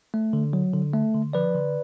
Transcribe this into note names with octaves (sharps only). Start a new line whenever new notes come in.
A3
D3
F#3
D3
A3
D3
F3 B4 D5
D3